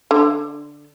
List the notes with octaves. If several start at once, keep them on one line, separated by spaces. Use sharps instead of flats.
D3